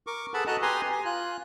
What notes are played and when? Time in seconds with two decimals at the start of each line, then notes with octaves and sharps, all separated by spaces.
0.07 A#4 C#6 D6
0.34 G#4 A4 B4 F#5 A5 B5
0.47 F#4 A4 D#5 A5 A#5 F#6
0.62 G4 B4 G#5 A#5 C6 D#6
0.92 G#5
1.05 F4 F#6